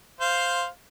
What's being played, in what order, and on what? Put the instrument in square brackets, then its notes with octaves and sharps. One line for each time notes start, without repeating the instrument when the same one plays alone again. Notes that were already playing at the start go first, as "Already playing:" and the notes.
[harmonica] C5 F5